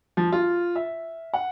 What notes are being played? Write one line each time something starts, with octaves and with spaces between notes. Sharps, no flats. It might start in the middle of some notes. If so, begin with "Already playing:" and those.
F3
F4
E5
F#5